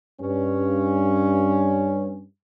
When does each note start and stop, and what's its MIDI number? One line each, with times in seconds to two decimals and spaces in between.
0.20 2.24 43
0.20 2.24 61